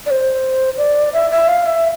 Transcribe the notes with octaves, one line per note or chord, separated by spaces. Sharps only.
D5
C5
D5
E5
E5
F5
E5